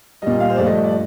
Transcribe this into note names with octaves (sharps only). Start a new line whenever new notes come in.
A#2 G3 D#5
F5
C5
G2 F3 A3 D5
D#5
D5